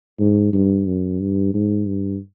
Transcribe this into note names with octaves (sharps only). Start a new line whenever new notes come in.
G#2
G2
F#2
G2
G#2
G2